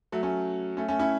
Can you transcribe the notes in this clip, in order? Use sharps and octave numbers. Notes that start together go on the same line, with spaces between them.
F#3 A3
A3 C#4
A3 C#4
A3 C#4
C#4 E4